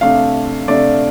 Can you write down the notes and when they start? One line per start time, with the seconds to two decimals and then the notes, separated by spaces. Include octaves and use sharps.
0.01 C3 A3 D4 F5
0.68 C3 A3 D4 D5